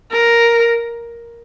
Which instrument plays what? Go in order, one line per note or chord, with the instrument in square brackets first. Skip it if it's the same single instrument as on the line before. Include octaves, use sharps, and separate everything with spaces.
[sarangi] A#4